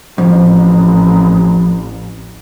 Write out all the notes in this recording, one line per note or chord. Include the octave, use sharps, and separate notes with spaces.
A1 F2